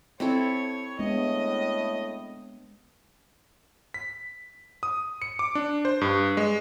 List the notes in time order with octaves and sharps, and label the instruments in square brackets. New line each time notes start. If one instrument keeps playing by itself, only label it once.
[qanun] C4 E4 A4 [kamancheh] C#5
[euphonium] A2 [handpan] G#3 B3 D4 [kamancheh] D#5
[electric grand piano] B6
D#6
C#7
D6
D4
C5
G2
G#3